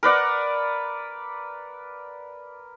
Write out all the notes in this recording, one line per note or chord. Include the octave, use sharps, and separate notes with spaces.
A#4 B4 D5 F#5